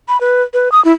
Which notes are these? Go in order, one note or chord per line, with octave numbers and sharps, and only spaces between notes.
B5
B4
B4
D#6
E4